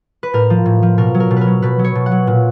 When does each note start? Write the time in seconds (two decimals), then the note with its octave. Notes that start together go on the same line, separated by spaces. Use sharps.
0.23 B4
0.34 A2 A#4
0.50 F3
0.66 A2
0.83 F3
0.98 B2 A#4
1.15 F#3
1.20 A#4
1.31 B2
1.36 A#4 B4
1.47 F#3
1.62 B2 B4
1.79 F#3
1.84 C#5
1.95 B2
2.06 F#5
2.11 F#3
2.27 A#2